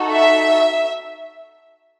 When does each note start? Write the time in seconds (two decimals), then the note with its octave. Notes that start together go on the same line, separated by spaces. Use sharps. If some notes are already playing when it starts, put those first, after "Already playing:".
Already playing: D#4 F#4 A4
0.11 E5